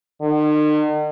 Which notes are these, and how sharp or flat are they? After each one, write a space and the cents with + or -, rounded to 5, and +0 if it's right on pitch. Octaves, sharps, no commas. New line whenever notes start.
D#3 -45